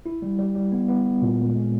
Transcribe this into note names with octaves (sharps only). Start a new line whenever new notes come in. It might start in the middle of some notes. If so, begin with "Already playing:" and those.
E4
G3
G3
G3
B3
B3
B3
A#2
G#3
G#3